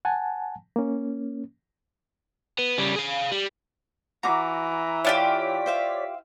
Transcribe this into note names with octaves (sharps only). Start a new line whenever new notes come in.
F#5 G#5 A5
A#3 C#4
B3
C#3 G3
G#4 F5
G3
E3 F#4 A#5 D6
D4 F4 G4 C#5 D5 E5 C6 B6
C5 E5 F5